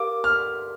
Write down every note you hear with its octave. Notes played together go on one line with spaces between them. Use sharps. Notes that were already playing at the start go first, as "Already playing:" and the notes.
Already playing: G4 A#4 F5 D6
F6